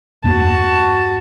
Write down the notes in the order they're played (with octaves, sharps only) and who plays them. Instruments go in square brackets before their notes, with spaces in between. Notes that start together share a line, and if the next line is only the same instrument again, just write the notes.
[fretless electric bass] E2 G2 A#3 [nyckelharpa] F#4 A5